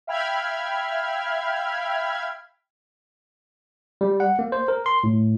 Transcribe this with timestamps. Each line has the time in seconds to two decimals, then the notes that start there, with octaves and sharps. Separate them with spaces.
0.07 E5 F5 G5 B5 F6 G#6
4.01 G3
4.20 F#5
4.39 A#3
4.52 C5
4.68 A#4
4.86 C6
5.04 A2